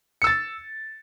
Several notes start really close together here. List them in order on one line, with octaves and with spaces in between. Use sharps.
C#7 E6 A6